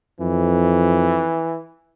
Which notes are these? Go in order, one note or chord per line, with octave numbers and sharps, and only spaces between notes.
F2 E3